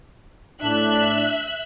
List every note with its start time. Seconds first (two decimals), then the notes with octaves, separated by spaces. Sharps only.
0.62 A2 D4 E5 F#6